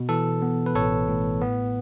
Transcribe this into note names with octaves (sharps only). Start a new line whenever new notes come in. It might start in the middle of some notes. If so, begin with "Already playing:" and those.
Already playing: B2
E3 A4
B3
B4
A1 A4 C#5
A2
B3